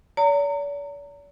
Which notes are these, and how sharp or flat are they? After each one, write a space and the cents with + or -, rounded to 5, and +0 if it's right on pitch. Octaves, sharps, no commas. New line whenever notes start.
D5 -45 A#5 -30